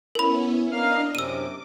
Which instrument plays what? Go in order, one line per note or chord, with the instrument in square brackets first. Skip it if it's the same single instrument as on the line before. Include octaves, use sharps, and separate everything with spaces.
[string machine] B3 C#4 E4 [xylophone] A#4 B5
[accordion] A#3 F5 F6 [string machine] D4 D#5
[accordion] F#2 C3 [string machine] D6 [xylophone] E6 D#7